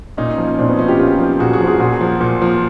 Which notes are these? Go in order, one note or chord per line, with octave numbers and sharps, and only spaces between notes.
A#2 C#4 D#4
F3
A#2 C4 D4
B3 C#4
F3 C#4 D#4
F4 G4
A#2 F4 G4
F3
A#2 F#4 G#4
F#4 G#4
F3
F#4 G#4
A#2 F#4 G#4
F3
A#2
F3